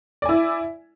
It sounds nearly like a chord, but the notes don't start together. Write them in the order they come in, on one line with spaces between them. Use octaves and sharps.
D5 G#5 E4